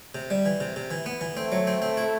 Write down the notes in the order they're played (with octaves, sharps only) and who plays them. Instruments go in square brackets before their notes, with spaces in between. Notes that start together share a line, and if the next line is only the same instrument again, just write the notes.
[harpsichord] C3
G3
E3
C3
C3
E3
B3
E3
[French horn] A3 [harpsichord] C4
[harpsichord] F#3
C4
C4
E4